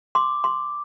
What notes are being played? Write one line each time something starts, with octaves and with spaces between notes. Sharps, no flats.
C6 D6
C6